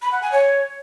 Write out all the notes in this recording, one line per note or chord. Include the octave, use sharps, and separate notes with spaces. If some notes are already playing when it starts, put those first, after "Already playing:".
B5
F#5
G#5
C#5